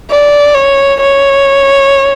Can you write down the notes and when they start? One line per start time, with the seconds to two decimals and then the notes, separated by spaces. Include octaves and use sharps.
0.10 D5
0.54 C#5
1.00 C#5